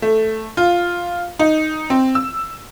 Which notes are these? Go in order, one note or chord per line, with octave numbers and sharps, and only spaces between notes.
A3
F4
D#4
C4
E6